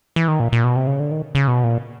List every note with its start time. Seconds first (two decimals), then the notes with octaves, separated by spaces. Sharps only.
0.16 E3
0.28 D#3
0.40 A#2
0.52 A#2
0.64 B2
0.76 C3
0.87 C#3
1.00 D3
1.11 D#3
1.35 C#3
1.48 B2
1.64 A#2